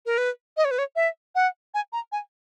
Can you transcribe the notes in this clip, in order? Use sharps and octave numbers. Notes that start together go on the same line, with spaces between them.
A#4
B4
D#5
C#5
B4
C#5
E5
F#5
G#5
A#5
G#5